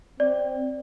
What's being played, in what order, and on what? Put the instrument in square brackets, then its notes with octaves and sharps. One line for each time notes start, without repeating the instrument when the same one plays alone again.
[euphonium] C4 [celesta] D5